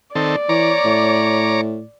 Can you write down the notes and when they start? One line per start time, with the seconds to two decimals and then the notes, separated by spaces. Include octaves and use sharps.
0.15 D#3 C4 A4 D5
0.49 E3 C#5 A#5 D6
0.85 A2